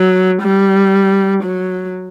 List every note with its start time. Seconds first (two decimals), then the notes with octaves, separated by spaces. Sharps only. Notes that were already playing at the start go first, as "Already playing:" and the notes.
Already playing: F#3
0.42 G3
1.43 F#3